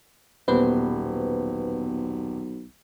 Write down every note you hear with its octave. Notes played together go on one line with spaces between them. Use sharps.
D#1 B1 B3 B4 C5